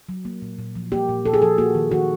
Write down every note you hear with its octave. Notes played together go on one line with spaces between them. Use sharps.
F#3
A#3
A#2
A#2
F3
A#3 G4
A#2
A#2 A4
G#4
F3 A4
A#3 F#4
D#3
D#3 F#4